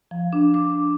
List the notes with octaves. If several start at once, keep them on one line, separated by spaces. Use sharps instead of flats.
F3
D4
D6